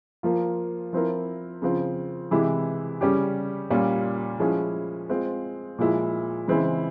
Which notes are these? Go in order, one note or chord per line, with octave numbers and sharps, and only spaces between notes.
F3 A#3 F4
F3 C4 E4 A#4
C#3 F3 C4 F4
C3 E3 G#3 E4 G4
C#3 G3 C#4 G4
A#2 G3 C#4 F4
F3 G#3 C#4 E4 G#4
G#3 C4 F4
A#2 F3 G#3 E4
C#3 E3 G#3 C4 E4